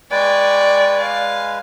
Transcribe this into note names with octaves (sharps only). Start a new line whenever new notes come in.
G#3 B4 D5 G5 G#5 C#6
F5